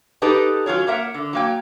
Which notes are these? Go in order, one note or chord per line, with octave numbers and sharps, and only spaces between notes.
D#4 G4 A4 B4 D#5
F#3 C#4 F4 C#5
A#3 A#4 E5 F#5
D3
F#3 A#3 G5